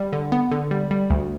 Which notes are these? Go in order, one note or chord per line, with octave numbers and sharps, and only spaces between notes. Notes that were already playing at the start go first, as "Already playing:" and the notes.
Already playing: G3
D3
B3
D3
G3
G3
D2